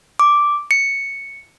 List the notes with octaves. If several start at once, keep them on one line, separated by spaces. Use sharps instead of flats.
D6
C#7